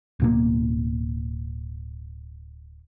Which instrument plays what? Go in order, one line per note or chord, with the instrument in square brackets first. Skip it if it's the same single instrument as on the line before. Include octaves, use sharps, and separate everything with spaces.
[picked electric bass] D1 B2 A#3